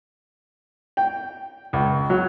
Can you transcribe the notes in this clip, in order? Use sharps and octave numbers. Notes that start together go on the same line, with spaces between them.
G5
C#2
F#3